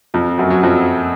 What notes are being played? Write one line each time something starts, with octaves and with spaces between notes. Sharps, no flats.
F2 F3
F#2 F#3
F#3
F2 F3